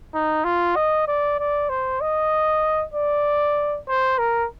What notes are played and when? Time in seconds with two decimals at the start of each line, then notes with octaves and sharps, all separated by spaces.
0.14 D#4
0.44 F4
0.75 D#5
1.07 D5
1.39 D5
1.69 C5
2.01 D#5
2.94 D5
3.88 C5
4.18 A#4